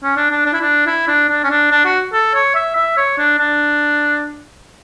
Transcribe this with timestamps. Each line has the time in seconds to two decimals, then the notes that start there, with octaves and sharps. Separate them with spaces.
0.03 C#4
0.17 D4
0.31 D4
0.45 D4
0.53 E4
0.61 D4
0.87 E4
1.08 D4
1.29 D4
1.44 C#4
1.50 D4
1.71 D4
1.85 F#4
2.13 A4
2.34 C#5
2.55 E5
2.76 E5
2.97 C#5
3.18 D4
3.39 D4